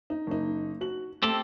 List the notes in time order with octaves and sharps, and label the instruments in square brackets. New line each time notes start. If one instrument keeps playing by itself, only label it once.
[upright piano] D#4
F#1 D#4
F#4 F#7
[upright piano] A3 [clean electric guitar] C4 G4 A4